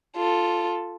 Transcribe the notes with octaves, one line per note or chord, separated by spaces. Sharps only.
F4 A4